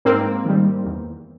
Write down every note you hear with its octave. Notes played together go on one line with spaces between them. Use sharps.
G#2 A#3 C4
D#3 G3
E2